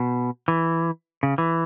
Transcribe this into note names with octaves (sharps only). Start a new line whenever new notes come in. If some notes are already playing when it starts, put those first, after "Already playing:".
Already playing: B2
E3
C#3
E3